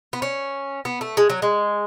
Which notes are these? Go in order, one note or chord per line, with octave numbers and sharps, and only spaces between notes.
B3
C#4
B3
A3
G#3
F#3
G#3